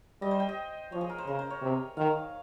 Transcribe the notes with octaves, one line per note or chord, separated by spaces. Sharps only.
G3 D#5
C5
G5
D#5
F3 C#5
G#4
A#4
C5
C#3 A#4
C5
C#5
C3
D#3 F5